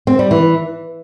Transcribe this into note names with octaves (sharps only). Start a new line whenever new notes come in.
C4
G3
E3